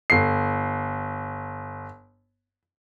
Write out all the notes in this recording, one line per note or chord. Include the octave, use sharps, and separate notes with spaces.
G1 C7